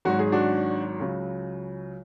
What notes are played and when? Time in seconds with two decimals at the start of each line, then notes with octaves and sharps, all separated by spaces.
0.05 G#1 G#2 F#3 F#4
0.19 G#4
0.32 D4 F#4
0.99 C#2 C#3 F#3